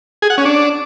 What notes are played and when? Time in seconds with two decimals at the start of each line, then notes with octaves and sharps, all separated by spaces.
0.22 G#4
0.30 F#5
0.38 C#4
0.45 D4